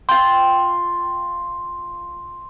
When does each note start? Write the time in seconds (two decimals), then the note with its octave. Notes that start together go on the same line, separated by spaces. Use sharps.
0.09 F4 G5 C6